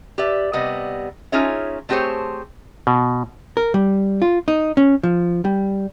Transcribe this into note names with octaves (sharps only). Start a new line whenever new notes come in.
G4 B4 D5 E5
C3 G3 B3 D#5
C#4 D#4 F4 G#4 C#5 E5
A3 C4 G4 G#4 C5 C#5
B2
A#4
G3
F4
D#4
C#4
F3
G3